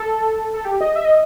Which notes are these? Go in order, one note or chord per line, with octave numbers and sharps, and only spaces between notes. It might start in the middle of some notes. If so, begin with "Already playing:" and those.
Already playing: A4
A4
G4
D#5
E5
D#5